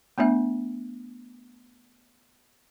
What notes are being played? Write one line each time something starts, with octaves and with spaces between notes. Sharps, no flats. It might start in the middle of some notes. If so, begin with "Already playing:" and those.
A3 B3 D4 E5